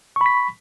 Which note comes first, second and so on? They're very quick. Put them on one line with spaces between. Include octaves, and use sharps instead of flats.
C#6 B5 B6